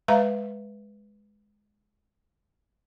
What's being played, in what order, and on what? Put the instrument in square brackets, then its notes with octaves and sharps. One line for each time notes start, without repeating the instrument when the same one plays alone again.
[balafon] G#3 B4 E5 F5 A#5